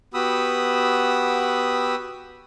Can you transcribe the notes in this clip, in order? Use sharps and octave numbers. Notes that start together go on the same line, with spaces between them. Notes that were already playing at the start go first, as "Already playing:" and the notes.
B3 F#4 G4 B5 D#6 E6